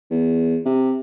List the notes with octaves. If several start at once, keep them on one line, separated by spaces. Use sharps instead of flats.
E2
C3